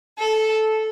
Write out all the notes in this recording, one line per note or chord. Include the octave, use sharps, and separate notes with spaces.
A4